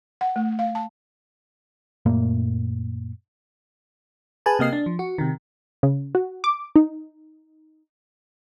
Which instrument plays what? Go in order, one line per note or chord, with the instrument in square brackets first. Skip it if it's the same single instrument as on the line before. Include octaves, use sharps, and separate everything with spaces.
[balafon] F#5
A3
F5
A5
[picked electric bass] F#2 A#2 A3 A#3
[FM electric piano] G#4 B4 G#5 A5
C3 A#3 D#5 C7
D4
F3
F#4
C3 D#3
[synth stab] C#3
F#4
D6
D#4